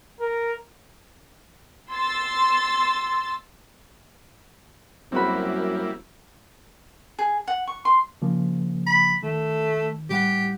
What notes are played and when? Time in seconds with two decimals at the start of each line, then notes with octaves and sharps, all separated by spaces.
0.21 A#4
1.91 C6 E6 A6
5.12 F#2 G3 A#3 C4 E4 F#4 B5
7.19 G#4
7.48 F#5
7.67 C#6
7.85 C6
8.22 C#3 F3 A#3
8.87 B5
9.23 D#3 A3
10.10 A2 G3 G4 F#5